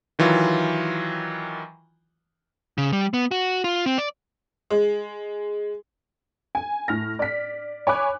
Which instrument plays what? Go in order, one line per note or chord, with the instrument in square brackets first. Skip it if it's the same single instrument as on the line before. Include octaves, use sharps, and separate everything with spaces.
[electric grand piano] D#3 E3 F#3 F4
[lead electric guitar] C#3
G3
B3
F#4
F4
C4
D5
[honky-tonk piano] G#3
G#5
A2 F6 A#6
D5 B6
C#5 G#5 B5 D6 F#6